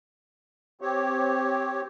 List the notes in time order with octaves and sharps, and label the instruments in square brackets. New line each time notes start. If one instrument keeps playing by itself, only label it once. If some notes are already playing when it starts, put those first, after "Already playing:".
[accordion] C4 G4 C#5